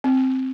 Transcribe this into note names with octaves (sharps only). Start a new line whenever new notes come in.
C4